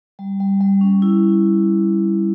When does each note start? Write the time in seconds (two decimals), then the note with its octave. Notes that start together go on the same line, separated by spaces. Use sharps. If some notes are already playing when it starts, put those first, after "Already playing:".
0.19 G3
0.40 G3
0.61 G3
0.81 C#4
1.02 E4